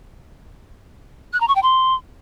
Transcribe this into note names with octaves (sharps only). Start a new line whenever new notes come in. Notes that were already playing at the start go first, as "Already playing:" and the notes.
F#6
A#5
C#6
G5
C6